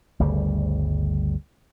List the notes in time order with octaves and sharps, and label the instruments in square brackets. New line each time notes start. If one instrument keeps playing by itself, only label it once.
[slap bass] G1 D2 C#3 G3